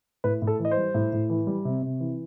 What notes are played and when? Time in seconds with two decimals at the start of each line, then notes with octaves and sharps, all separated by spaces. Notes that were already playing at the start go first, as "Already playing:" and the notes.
0.24 A2 B4
0.42 A2
0.47 A4
0.60 E3
0.65 D#5
0.71 C5
0.77 G3
0.94 A2
1.13 A2
1.30 E3
1.47 G3
1.65 C3
1.83 C3
2.00 E3